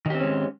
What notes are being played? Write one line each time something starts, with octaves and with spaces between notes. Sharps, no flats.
D#3 G#3 C4 C#4 G4